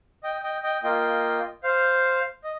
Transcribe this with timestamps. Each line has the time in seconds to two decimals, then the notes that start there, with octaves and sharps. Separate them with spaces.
0.23 D#5 G5
0.43 D#5 G5
0.63 D#5 G5
0.83 A#3 F4 D#5 G5
1.63 C5 F5
2.44 D#5